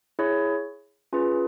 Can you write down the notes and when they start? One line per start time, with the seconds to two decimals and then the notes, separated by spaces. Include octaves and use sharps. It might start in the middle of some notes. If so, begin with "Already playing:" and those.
0.19 E4 G#4 C#5
1.13 C#4 F4 G#4 B4